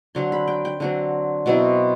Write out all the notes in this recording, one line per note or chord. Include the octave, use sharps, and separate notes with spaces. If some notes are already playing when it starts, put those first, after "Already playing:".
D3 F#3 C4 C6
B5
G5
G5
D3 F#3 C4
B2 F#3 C4 E4